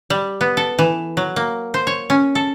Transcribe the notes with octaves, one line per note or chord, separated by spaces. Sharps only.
G3
B3
A4
E3
F#3
A#3
C5
C#5
C#4
A4